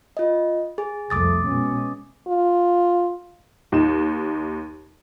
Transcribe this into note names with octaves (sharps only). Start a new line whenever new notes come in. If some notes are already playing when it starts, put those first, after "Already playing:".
F4 D#5
G#4
C2 F2 A3 D6 D#6 A6
B2 G#3 C#4
F4
D#2 D#4 E7